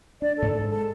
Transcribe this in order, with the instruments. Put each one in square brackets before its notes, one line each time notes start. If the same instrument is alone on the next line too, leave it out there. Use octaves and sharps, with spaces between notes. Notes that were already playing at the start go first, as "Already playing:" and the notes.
[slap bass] D4 [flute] D5
[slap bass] G#2 [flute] A4
[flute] A4
[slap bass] G#3
[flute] A4